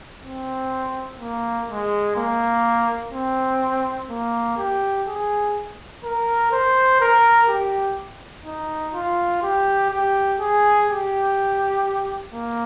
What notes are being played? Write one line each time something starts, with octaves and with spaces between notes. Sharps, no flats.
C4
A#3
G#3
A#3
C4
A#3
G4
G#4
A#4
C5
A#4
G4
D#4
F4
G4
G4
G#4
G4
A#3